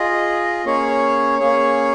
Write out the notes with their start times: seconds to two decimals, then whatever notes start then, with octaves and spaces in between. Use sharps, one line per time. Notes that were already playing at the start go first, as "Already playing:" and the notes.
Already playing: F4 G#4 D#5
0.65 A#3 C#4 G#4 C#5
1.39 A#3 C#4 G#4 C#5